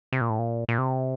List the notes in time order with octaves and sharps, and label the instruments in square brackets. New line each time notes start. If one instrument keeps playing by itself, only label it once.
[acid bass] C3
A#2
A2
A#2
A#2
C3